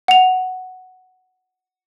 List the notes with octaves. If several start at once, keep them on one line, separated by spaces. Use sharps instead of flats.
F#5 F7